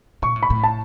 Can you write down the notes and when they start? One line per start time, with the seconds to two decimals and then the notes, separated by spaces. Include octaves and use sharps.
0.22 A#2 C#6
0.36 A2
0.43 B5
0.50 A2
0.64 A5